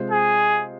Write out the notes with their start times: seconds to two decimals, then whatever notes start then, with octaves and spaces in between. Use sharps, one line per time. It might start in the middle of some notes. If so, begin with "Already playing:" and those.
Already playing: C3 G#3 F4 C5
0.10 G#4